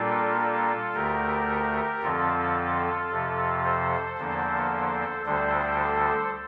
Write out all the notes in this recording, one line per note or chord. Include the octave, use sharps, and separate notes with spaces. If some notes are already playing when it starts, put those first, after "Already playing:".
Already playing: A#2 G3 A#3 D4 F4 A4
F4 A4
D2 D3 A3 G4 A#4
F2 D3 F3 C4 F4 A4
F2 C3 F3
A4 C5
E2 D3 F3 A#3 D4
D2 D3 G3 D4 A4 C5